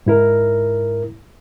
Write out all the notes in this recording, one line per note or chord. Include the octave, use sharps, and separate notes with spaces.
G#2 E4 A#4